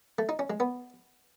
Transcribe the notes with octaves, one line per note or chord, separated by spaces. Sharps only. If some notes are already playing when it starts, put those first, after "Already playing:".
A3
D#4
C#4
G#3
B3